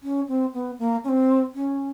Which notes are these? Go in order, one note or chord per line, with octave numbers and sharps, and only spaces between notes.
C#4
C4
B3
A#3
C#4
C4
C#4